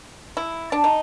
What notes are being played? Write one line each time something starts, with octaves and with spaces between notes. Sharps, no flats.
E4
D4
D#4